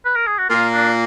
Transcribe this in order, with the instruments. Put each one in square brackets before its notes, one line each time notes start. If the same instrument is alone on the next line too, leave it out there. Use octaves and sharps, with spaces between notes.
[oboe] B4
A#4
G#4
F#4
[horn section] A#2 A#3 [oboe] F4
[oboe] D4